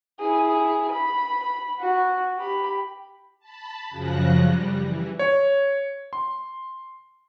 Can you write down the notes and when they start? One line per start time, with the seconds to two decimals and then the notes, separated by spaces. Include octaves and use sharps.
0.20 E4 G#4
0.92 B5
1.80 F#4
2.37 G4 B5
3.40 A5 B5
3.89 F#2 C#3 F3 F#6 A#6
4.36 G3
4.78 E3
5.19 C#5
6.13 C6